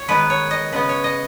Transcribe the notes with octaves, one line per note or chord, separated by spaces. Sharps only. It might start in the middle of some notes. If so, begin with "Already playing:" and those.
Already playing: C#5
D#3 G#3 B3 B4
C#5
D#5
C#3 G#3 B3 B4
C#5
D#5